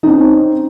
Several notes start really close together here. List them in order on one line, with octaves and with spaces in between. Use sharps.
D#4 C#4 C4